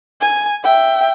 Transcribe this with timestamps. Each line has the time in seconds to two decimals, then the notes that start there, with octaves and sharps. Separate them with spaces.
0.21 G#5
0.64 E5 G5